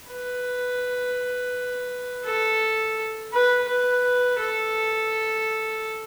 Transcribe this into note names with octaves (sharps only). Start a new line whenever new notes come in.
B4
A4
B4
B4
A4